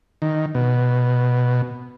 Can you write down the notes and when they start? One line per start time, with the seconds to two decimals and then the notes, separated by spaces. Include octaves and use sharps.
0.22 D#3
0.55 B2